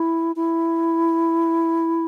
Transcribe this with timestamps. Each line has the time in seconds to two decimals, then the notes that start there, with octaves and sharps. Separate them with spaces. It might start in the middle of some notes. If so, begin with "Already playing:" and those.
Already playing: E4
0.36 E4